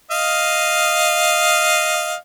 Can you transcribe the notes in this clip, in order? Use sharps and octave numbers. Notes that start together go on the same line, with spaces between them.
D#5 F5